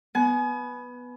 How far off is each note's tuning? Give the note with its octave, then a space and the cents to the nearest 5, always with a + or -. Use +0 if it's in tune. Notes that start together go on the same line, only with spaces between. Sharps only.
B3 +0 G#5 +35